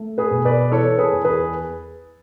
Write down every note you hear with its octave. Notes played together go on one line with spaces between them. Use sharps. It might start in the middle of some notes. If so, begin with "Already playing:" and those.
Already playing: A3
G#4 B4
B2
B4 D5
E3 A4 C#5
G#4 B4
E2
G#4 B4